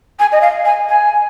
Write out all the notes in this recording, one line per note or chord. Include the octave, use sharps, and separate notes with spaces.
G#5
D#5
F5
G#5
G#5